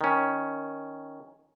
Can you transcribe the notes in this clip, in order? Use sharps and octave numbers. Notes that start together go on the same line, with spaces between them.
D#3 C#4